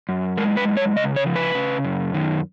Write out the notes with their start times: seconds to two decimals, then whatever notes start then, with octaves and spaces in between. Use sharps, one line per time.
0.09 F#2
0.38 G#3 A#4
0.57 B4
0.67 F#2
0.77 C#5
0.96 C#3 D#5
1.16 C#5
1.26 F3
1.36 B4
1.55 C#3
1.85 F#2
2.14 D#3